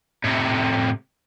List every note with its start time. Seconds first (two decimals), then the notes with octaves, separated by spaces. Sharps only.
0.24 A2 C3